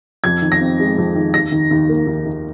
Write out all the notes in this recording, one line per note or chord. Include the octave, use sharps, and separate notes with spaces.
F2 G#6
D#3
A#6
C4
G#3
F2
D#3
D#2 A#6
D#3
D#2
A#3
D#2
D#3